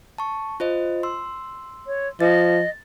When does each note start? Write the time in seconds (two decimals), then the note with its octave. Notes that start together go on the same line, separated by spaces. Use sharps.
0.18 A5 C#6
0.60 F4 C5 D#5
1.03 C6 E6
1.87 C#5
2.20 F3 D#5 A6